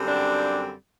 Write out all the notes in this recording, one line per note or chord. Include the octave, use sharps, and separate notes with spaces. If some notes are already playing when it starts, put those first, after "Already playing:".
Already playing: F#2 D3 G3 C4
D4